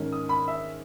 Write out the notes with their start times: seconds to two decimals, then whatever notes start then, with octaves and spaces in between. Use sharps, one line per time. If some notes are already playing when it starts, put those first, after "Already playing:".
Already playing: G#2 D#3 A#3 C#4
0.12 D#6
0.29 B5
0.48 E5